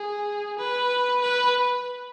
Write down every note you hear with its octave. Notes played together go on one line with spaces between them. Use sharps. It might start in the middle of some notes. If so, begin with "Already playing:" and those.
Already playing: G#4
B4
B4